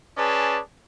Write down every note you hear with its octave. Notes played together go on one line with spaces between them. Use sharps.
C#4 G#4 B4 D5 A5